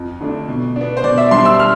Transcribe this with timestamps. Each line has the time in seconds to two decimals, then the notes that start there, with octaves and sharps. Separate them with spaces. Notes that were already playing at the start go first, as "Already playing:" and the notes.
Already playing: F2
0.21 D3 A3 D4
0.48 B2
0.76 B3 D4
0.97 C5
1.04 B2 D5
1.18 E5
1.31 G3 D4 C6
1.45 E6
1.60 F6